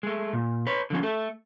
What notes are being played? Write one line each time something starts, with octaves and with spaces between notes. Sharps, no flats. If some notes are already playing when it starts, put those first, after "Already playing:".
G#3 A3
A#2
B4 C#5
D3 F3 C#4
A3 A4